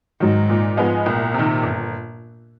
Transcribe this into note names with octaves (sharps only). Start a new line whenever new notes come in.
G#2 D#3 F#3
A#2
F3 G#3 B3
C2 A#2
C3 D#3
G1